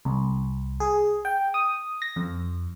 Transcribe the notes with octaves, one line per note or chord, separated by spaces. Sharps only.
C2
G#4
G5
D#6
A#6
F2